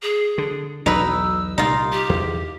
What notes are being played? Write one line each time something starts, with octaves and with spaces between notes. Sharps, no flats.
G#4
D3
B1 E2 F#3 D#4 B4 E6
C2 A#2 G3 D#4 F4
G4
E2